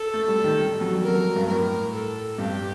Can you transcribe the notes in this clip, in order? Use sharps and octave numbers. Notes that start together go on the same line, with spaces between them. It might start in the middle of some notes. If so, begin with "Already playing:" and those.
Already playing: A4
A3
G3
D#3
G3
F#3
G3
F#3 A#4
G2
A2 A#4
A4
G2 G4